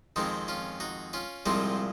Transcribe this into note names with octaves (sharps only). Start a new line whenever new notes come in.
F2 D#3 G#3 C4 D#4
C#4 F4
D#4 F#4
C#4 F4
C2 A#2 F3 G#3 C4 D#4